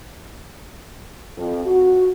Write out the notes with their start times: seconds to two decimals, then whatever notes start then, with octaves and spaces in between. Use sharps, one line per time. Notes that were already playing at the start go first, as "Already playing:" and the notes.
1.37 F2
1.66 F#4